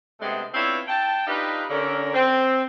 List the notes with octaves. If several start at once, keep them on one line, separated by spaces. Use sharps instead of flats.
C3 G#3 A3 B3 C4 D4
B3 C4 D4 E4 F4 C#5
G5 A5
D4 D#4 F4 G4 B4
D3 C#4 A#4
C4